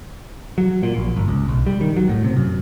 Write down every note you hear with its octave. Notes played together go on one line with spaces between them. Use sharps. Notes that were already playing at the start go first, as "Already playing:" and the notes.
F#3
A#2
A#1
G1
C#2
B1
G3
D#3
F#3
A2
C3
F#2